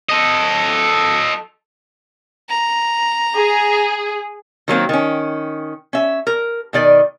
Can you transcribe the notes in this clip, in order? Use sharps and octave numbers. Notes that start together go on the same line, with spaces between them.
A4 D#5
A#5
G#4
D#3 F#3 A#3 C4
D#3 C#4
C#4 E5
A#4
B2 D#3 D5